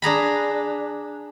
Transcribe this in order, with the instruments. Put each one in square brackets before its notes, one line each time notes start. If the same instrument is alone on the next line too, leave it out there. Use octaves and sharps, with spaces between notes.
[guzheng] D4 G#4 A#5 B5